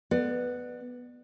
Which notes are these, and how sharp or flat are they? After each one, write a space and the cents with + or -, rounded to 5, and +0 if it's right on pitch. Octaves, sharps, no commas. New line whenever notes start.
B3 +0 D5 +30